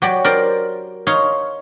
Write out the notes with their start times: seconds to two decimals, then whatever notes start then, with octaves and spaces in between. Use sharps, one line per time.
0.02 F#3 G4 D5
0.25 A#4 C5 D5
1.07 D#4 C#5 F5 C6